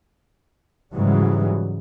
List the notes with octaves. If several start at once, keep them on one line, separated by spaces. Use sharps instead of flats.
G#2 C#3 E3 F#3 G3